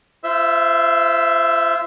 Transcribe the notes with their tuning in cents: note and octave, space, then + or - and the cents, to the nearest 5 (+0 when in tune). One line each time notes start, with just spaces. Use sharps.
F4 -40 C5 -15 E5 +0